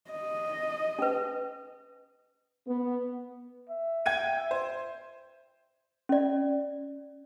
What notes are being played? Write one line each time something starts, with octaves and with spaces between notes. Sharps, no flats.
D#5
C#4 B4
B3
E5
G5 G#6 D#7
C5
C#4 D5